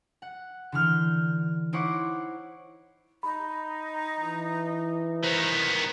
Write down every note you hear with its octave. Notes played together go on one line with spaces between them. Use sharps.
F#5
D3 E3 F6 G6
D#4 E4 C5 C#5 F#5 D6
D#4 B5
E3
D#3 B3 C5